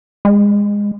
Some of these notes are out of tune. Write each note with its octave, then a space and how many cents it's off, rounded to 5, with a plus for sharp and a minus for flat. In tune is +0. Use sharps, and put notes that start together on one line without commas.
G#3 -20